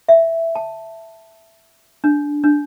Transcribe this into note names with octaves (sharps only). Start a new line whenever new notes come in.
E5
A5
D4
D4